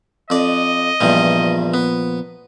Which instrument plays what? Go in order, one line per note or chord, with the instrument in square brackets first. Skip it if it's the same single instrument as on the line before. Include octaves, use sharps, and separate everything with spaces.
[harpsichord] F2 D5 [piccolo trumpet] D#5
[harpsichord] E2 G2 G3 [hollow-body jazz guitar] A#2 F3
[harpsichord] B3